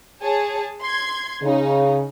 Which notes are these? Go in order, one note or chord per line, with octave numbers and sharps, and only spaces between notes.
G#4 C#5 A5
C6 G#6
C#3 D#4